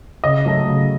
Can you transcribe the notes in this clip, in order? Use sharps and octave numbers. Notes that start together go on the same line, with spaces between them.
C#3 D#5
F#3 A3
C#3